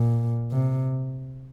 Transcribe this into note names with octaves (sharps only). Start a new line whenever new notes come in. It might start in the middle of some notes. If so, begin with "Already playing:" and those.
Already playing: A#2
C3